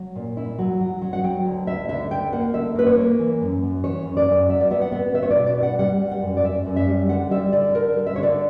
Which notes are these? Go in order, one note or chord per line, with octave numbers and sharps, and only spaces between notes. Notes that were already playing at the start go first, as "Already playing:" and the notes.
Already playing: F#3
A#2
E4
F#3
F#3
F#3
F#5
F#3 G5
D2
D2 E5
D3 E5
D2 G5
A#3 F#5
D3 E5
A#3 B4
C#5
A#3
E3
F#2
F#2
E3 C#5
F#2
D5
F#2
F#3 E5
D5
B3 E5
F#5
B3
B3 E5
C#5
D5
B2
D5
E4
F#5
G3 F#5
G3
F#5
F#2
D5
F#2 E5
F#2
E5
G3
D3 F#5
G3 E5
D3 D5
D3 A#4
G3
E5
D3 C#5
D5